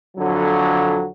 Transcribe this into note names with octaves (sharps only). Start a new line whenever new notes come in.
F2 D3 F#3